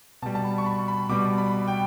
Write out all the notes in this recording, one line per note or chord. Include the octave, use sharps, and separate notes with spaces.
B2 G3 A5
A5
B5
C#6
B5
B5
B2 G3 D6
B5
G5